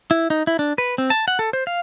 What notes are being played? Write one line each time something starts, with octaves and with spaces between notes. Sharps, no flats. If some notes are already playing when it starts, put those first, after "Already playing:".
E4
D#4
E4
D4
B4
C4
A5
F#5
A4
C5
F5